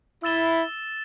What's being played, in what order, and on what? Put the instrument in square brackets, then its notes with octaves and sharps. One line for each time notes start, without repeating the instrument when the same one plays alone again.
[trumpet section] E4 [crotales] E6 A6 E7 G7